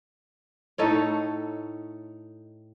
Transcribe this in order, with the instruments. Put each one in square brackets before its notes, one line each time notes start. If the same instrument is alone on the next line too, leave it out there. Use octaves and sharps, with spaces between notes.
[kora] A2 D#4 A4 C#5